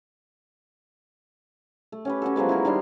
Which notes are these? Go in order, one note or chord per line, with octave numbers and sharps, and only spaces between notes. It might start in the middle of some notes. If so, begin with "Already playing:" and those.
A3
C#4 G4 B4
C#4 F#4 A4
F3 F#3 G#3 B3
E4 G#4 A#4 C5
D#3 G3 D4 C6